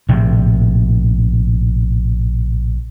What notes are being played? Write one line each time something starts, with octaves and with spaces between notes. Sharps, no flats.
A#1 A2 C3